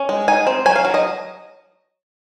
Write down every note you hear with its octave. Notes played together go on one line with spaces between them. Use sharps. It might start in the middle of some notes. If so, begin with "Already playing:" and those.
Already playing: C#4
G#3
D#4 G#5
C4
F#3 G#5
F5
F#3
D#5